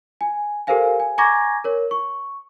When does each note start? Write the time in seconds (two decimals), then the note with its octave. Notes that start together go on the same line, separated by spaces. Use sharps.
0.21 G#5
0.67 G4 A4 A#4 C5 F5 G#5
1.00 G#5
1.18 G#5 A#5 C#6 D6 G#6 A#6
1.64 A#4 C#5
1.91 C#6